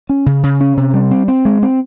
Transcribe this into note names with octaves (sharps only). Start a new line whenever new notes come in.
C#4
C#3
C#3
C#4
C3
G3
C4
C4
G#3
C4